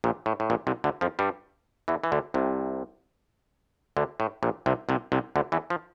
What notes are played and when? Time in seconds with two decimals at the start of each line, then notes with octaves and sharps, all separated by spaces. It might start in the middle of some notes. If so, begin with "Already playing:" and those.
0.04 A#1 A#2
0.26 A2
0.40 A2
0.50 A#1 A#2
0.67 C2 C3
0.84 D2 D3
1.01 F2 F3
1.19 G2 G3
1.88 E2 E3
2.04 E3
2.12 D2 D3
2.34 C2 C3
3.97 D2 D3
4.20 A2
4.43 A#1 A#2
4.66 C2 C3
4.89 C2 C3
5.12 C2 C3
5.36 D2 D3
5.52 E2 E3
5.70 F3